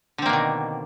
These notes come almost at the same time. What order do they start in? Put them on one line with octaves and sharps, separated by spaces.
D3 C4 A#3 B2 D#3